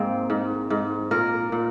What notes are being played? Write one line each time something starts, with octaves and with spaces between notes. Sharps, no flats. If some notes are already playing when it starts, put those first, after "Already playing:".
Already playing: G#2 A#3 C4
G#2
G#2
A#2 A#4
A#2